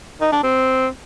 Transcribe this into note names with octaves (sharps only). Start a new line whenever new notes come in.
D#4
D4
C4